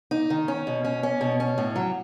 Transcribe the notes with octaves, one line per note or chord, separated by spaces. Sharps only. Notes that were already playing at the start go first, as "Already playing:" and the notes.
D#4
D#3
C#4
B2
C#4
C#4
B2
C#4
A2
F#3